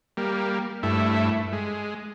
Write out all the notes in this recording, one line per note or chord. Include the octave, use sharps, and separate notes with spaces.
G3 A#3
G2 A3 E4
G#3